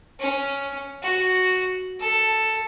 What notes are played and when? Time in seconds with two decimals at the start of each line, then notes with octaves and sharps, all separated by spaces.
0.20 C#4
1.03 F#4
2.00 A4